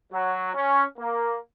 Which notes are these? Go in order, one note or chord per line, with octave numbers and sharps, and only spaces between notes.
F#3
C#4
A#3